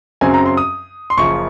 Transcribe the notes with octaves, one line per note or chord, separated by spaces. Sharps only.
F#2 C#3 F#3 C4 G#5
A#5
C6
D#6
C6
F#1 F#2 C#3 F3 C#6